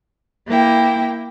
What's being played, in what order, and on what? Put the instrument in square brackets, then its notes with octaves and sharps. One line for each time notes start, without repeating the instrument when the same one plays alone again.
[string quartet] A#3 E4 G5